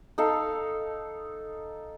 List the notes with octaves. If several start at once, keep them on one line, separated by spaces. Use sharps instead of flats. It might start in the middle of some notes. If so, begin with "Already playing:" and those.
D#4 A4 F5